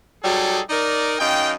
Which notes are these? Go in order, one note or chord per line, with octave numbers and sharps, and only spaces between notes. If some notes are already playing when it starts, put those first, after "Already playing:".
F#3 G3 D#4 G#4 A4
D#4 A#4 D5
F#2 D#4 F5 G5